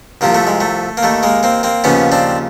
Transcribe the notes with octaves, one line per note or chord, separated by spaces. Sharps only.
C2 C3 F3 A#3
A3
G#3
A3
A#3
D#2 D#3 A3
G#3 A#3
A#3 C4
A#3 C4
D#2 C#3 F3 B3 C#4
C4 D4